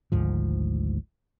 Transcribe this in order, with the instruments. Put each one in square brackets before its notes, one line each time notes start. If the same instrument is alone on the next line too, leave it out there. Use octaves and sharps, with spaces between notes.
[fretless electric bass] G#1 D2 G#2 F3